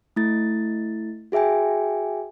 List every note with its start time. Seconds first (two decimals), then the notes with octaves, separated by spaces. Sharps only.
0.16 A3 E4 A6
1.32 F#4 G#4 E5 G5 G#5